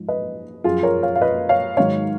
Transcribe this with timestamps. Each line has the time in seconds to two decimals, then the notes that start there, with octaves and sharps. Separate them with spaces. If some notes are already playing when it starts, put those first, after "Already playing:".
Already playing: G#2 F3
0.08 B4 D#5
0.64 F#2 F3 F4 G#4
0.83 A#4 C#5
1.03 C#5 F5
1.16 F5
1.21 B4 D#5
1.49 C#5 F5
1.77 G#2 D#3 F#3 C#5 F5